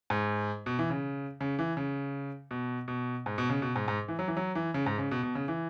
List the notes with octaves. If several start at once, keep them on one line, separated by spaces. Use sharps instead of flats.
G#2
B2
E3
C#3
C#3
E3
C#3
B2
B2
G#2
B2
C#3
B2
G#2
G#2
E3
F#3
E3
F#3
E3
C#3
G#2
C#3
B2
B2
C#3
E3